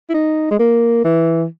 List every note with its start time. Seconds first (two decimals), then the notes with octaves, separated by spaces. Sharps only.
0.10 E4
0.14 D#4
0.51 G#3
0.59 A#3
1.04 E3